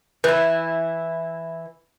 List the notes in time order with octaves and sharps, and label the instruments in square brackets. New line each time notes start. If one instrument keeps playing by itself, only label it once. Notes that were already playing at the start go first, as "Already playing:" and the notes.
[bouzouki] E3 E4 [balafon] B4